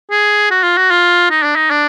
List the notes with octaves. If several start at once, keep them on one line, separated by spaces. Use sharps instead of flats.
G#4
F#4
F4
F#4
F4
D#4
D4
D#4
D4